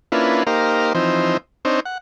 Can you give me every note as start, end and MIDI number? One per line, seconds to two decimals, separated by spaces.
0.12 0.43 58
0.12 0.43 61
0.12 0.43 62
0.12 0.43 64
0.12 0.43 65
0.12 0.43 71
0.47 0.93 58
0.47 0.93 63
0.47 0.93 67
0.47 0.93 70
0.47 0.93 72
0.47 0.93 77
0.95 1.37 52
0.95 1.37 53
0.95 1.37 60
0.95 1.37 63
0.95 1.37 72
1.65 1.80 60
1.65 1.80 62
1.65 1.80 63
1.65 1.80 72
1.65 1.80 73
1.86 1.98 78